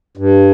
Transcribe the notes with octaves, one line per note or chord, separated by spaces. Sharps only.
G2